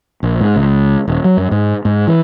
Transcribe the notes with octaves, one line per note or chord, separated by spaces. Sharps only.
A#1
G#2
C#2
D#1
F#3
F#2
G#2
G#2
E3